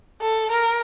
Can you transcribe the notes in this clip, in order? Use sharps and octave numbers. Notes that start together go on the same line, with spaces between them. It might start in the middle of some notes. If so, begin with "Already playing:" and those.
A4
A#4